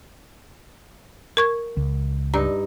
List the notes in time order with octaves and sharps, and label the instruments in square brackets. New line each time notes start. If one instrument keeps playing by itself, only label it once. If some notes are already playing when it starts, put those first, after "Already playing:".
[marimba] A#4 C#6 G#6
[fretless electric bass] C#2
[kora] G2 D#4 [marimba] D5 A#5